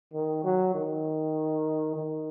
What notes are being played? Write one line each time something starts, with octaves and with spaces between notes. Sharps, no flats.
D#3
F#3
D#3
D#3